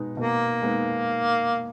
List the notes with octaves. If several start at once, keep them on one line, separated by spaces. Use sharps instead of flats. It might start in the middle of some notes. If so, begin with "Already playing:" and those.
Already playing: B2 G#3 B3 D#4
B2 A#3
G#3 B3 D#4